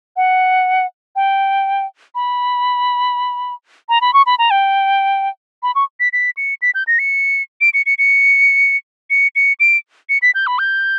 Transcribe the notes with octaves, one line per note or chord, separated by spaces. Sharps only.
F#5
G5
B5
A#5
B5
C#6
B5
A#5
G5
B5
C#6
B6
B6
C#7
B6
G6
A#6
C#7
D7
C#7
C#7
C#7
C#7
C#7
D7
C#7
B6
G6
B5
G6